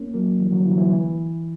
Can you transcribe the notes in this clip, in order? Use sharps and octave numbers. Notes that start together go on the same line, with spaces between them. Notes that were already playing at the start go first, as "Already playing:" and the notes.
Already playing: A#3 C#4
F#3 A#3
E3 G3
D3 F#3
E3
F#3
E3
E3